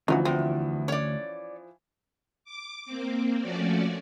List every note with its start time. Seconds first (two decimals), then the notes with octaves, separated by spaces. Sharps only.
0.08 D2 E3 F3 C#4 D#4 F#5
0.25 E2 C4
0.88 C#4 C#5 D5
2.44 D6
2.85 A#3 C4
3.40 F3 A3 C#4 F#4 D5